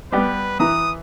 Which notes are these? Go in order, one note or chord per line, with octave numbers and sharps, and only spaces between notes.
G3 B3 G4 B4
E3 B4 A#5 D#6